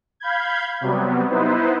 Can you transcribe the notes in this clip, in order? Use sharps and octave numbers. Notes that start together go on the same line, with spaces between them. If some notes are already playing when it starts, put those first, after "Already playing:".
F5 B5 G6 G#6
C3 F#3 G3 B3
B3 D#4 E4 B4 C5